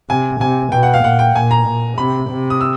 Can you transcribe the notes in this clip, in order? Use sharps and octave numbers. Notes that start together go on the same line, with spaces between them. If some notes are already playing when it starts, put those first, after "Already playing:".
C3 G#5
C3 G#5
B2 G5
F#5
F5
A#2 F#5
G5
A#2 G#5
A#5
A#2
C3 B5
C3
D#6
E6